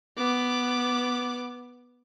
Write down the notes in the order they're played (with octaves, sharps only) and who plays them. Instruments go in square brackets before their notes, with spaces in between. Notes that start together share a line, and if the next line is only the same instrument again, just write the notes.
[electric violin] B3 D6